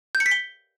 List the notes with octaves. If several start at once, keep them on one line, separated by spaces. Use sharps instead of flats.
G6
C#7
B6
G7